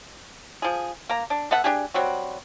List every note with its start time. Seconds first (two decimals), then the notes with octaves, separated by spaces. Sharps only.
0.62 F3 G#4
1.09 A#3 A#5
1.30 D4
1.51 B3 A4 E5 F#5
1.64 D4 G4 G#4
1.94 F#3 G3 C4 F#4